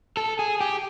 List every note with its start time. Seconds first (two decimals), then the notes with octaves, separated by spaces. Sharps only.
0.17 A4
0.39 G#4
0.61 G4